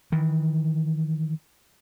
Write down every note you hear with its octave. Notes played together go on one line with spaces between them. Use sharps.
D#3 E3